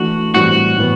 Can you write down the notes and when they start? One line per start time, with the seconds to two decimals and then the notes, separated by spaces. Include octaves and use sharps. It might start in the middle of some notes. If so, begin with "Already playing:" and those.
Already playing: E3 A3 D4 F#4
0.33 A2 E3 G3 C4 F#4
0.75 A2 E3 B3